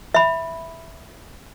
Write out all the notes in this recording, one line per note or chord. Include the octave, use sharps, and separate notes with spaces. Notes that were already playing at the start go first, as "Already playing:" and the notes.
E5 B5